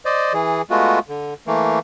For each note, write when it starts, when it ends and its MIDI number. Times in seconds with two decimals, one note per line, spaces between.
0.05 0.33 72
0.05 0.33 74
0.05 0.33 75
0.33 0.62 52
0.33 0.62 68
0.70 0.99 56
0.70 0.99 57
0.70 0.99 59
0.70 0.99 65
0.70 0.99 66
1.09 1.34 50
1.47 1.79 52
1.47 1.79 57
1.47 1.79 58